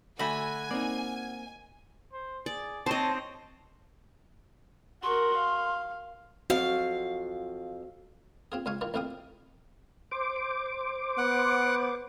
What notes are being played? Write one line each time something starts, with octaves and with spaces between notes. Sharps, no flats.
D3 A3 F#4 E5 G#5 B5
A#3 C4 D#4 D5
C5
G#4 D5
C4 D#4 C5 C#5 D#5 A5
F#4 A#4 C6
F5
F2 F#4 F5
C4 F4 G#4
C#2 G#3 F5 G#5 C#6
D#3 E3 F4
A1 F2 E4 F5 G5 D#6
C5 D6
B3 F#5